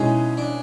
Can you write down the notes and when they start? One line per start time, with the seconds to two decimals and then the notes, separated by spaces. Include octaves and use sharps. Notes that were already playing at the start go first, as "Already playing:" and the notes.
Already playing: B2 G#3 C#4 D#4 E4 G#4
0.37 D4